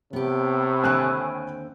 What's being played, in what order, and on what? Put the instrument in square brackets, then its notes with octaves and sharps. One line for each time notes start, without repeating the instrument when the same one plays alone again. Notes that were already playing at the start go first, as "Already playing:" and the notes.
[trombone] A2 [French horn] C3 [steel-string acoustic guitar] B3 G4
[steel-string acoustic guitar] D#2 D3 C4 [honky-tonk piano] G#5 E6 F#6